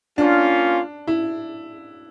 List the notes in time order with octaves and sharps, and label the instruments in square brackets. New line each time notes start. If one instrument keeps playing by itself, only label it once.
[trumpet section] A#3 C#4 F4 [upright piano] D4
[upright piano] E4